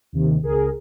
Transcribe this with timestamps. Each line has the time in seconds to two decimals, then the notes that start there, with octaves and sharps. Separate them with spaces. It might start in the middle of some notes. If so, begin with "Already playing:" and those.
0.12 D#2 C3 D#3
0.42 C#2 G#4 A#4